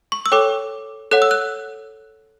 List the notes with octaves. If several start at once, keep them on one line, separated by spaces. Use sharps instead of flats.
C#6
E6
A4 C#5 G5 D6
A4 C#5 F#5 F#6
E6
F#6